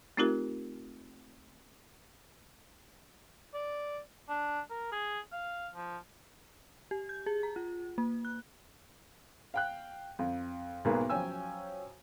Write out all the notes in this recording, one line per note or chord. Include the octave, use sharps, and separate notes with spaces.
A3 C4 D#4 F4 G4 A#4
D5
D4
A#4
G#4
F5
F3
G4
G6
G#4
A#5
F4
A#3
F#6
F5 G5 F#6
F2
B1 G#2 A#3 G#4 A#4 B4
F3 F#3 C#4 G5 G#5 E6